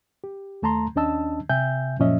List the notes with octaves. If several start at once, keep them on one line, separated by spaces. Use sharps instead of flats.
G4
D#2 A3 A5 A#5 C6
D#2 C#4 D4 D#5 A5 E6
C3 E5 G5 G#5 G6
F#2 A#2 F3 C#4 D#5 E5